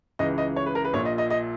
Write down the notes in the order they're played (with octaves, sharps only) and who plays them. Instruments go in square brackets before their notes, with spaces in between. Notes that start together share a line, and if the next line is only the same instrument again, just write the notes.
[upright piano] C#2 C#3 E3 D#5
D#5
C#5
B4
A#4
B4
A#1 A#2 C#5
D#5
D#5
D#5